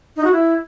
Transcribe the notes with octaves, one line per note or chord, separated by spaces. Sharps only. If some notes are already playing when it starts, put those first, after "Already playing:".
D#4
F#4
E4